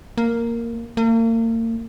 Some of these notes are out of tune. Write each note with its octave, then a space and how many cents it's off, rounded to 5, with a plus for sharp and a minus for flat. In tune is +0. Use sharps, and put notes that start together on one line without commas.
A#3 -5
A#3 -40